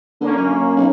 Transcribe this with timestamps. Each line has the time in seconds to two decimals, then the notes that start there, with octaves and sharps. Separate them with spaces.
0.21 D3 A#3 C#4
0.36 F#2
0.77 B1